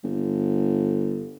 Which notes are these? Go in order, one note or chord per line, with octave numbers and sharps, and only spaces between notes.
G1